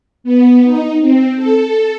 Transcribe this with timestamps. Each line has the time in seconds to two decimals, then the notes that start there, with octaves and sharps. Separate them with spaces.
0.24 B3
0.64 D#4
1.01 C4
1.36 A4